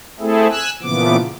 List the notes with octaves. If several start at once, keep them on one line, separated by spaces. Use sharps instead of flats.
A3 C4 E4 G#4 A4
G#5 E6 F#6
A#2 C#3 E3 F3 B3 D6